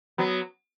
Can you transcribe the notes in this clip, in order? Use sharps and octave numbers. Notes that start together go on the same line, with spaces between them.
F#3 B3